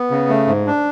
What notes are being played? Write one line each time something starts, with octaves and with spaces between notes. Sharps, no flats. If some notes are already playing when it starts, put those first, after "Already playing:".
Already playing: B3
C#3
A3
G#2
D4